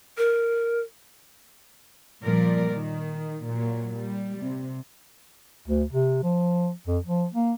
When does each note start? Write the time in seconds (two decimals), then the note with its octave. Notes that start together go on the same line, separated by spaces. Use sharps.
0.18 A#4
2.22 A#2 F3 G3 A#4 D5
2.73 D#3
3.47 A#2 F#3
3.99 G3
4.41 C3
5.68 D2
5.92 C3
6.23 F3
6.87 F2
7.05 F3
7.34 A#3